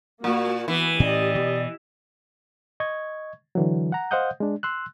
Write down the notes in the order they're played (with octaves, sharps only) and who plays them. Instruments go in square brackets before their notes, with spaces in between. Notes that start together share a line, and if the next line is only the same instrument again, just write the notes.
[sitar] A#2 [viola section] A#3 F#4
[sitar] E3 [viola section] B3
[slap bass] A2 C#4 [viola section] G4 D#5 [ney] D5
[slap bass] B2
[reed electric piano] D#5 C#6 G#6
D3 E3 F#3
F#5 A#5
C5 D#5 F5 F#5 D#6 G6
G#3 D4
C6 E6 F#6